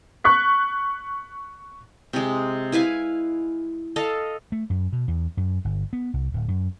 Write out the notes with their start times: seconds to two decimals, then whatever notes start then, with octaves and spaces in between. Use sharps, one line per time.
0.24 C#6 F#6 B6
2.13 C3 G#3
2.72 E4 B4 F5 G#5
3.96 A4 D#5 F5
4.52 A3
4.70 F#2
4.93 B2
5.08 E2
5.37 F#2
5.65 G1
5.93 B3
6.14 C2
6.34 D1
6.48 F#2